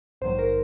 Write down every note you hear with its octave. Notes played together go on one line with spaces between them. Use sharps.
A#1 G#2 D#3 F#3 C5
A#4